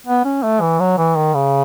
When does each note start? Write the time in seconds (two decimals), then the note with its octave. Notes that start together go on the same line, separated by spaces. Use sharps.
0.07 B3
0.25 C#4
0.43 A3
0.61 E3
0.80 F#3
0.98 E3
1.16 D#3
1.34 C#3